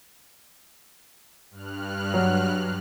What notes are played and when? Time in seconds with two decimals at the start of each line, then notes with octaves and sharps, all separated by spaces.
1.51 G2 F6 F#6
2.14 F#3